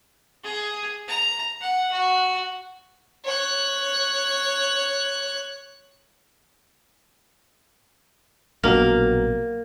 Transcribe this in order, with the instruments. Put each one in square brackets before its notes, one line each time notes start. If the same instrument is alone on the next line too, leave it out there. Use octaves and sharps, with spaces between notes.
[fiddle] G#4
A#5
F#5
F#4
C#5 F#6
[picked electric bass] A#1 B2 F#3 [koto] A#3